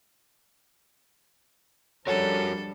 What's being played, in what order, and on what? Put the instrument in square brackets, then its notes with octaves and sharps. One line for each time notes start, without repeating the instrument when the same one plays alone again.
[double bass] F3 G3 [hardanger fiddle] D4 A4 [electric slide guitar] F#4 A#4 [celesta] C#5